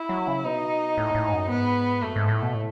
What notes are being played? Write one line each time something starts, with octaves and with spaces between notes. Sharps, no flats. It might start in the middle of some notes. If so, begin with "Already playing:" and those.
Already playing: E4
F#3
C#3
B2 D#4
A2
A2
G#2
F#2
G#2 B3
F#2 A3
G#2
A2
B2
A2